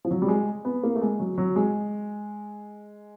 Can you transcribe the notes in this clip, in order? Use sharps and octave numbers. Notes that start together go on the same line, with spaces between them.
F3
F#3
G3
G#3
B3
A#3
A3
G#3
F#3
F#3
G#3